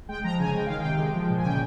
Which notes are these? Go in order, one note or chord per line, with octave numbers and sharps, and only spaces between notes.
G#3 G5
F3 A#5
C#3 G#5
G#3 G5
D#3 F5
C3 G5
G#3
F3
A#2
G#5
C#3 G5